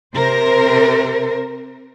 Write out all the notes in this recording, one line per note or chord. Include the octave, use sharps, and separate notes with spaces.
C3 A#4 C5